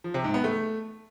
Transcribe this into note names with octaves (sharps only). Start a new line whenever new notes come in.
F3
C3
G#2
B3
A3